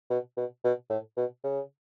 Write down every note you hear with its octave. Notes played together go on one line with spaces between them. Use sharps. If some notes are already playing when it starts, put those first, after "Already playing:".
B2
B2
B2
A2
B2
C#3